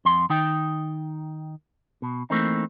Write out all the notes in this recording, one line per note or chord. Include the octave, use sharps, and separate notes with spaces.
F2 C6
D#3 D#4 G5
B2
E3 A3 A#3 C4 D#4